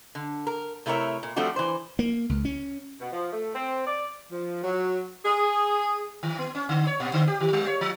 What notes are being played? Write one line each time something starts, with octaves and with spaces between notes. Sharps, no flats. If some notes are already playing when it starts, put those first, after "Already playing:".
D3
A#4
C3 A3 E4 A#4 C#5 E5
A#2
F3 G3 A3 C4 D4 F#4
E3 C5
A#3
C#2
C#4
B2
F3
A3
C4
D5
F3
F#3
G#4
D#3
B3
C#4
D3
C#5
A#2
D3
G4
D#3
G3
C#5
F3